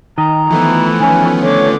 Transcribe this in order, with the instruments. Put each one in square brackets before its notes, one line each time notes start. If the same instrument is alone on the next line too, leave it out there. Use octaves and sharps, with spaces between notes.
[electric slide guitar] D#3 D#5 [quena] A#5
[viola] E3 [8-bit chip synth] F3 A3 B3
[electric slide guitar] D#3 C#4 [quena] G#5
[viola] D3 D6 [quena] C#5